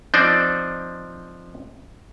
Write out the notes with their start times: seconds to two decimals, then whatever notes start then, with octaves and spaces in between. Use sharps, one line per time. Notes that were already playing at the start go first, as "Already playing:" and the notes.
0.14 F3 C4 D4 D#4 C5 D5